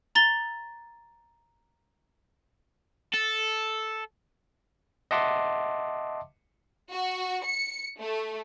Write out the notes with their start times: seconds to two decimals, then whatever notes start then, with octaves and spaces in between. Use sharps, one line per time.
0.15 A#5 A6 G7
3.14 A4
5.11 D#5 E5 F#5 A5 C6 D6
6.90 F#4
7.44 C#7
8.00 A3